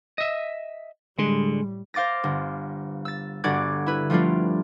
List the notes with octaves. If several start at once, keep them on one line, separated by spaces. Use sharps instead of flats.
D#5 E5
A2 D3 G3 G#3
C5 F5 D6 A6 A#6
G1
E6 A6
G1 D3 F#4 D5 D6 G#6
E4 B4
F3 G3 A3 D4 F4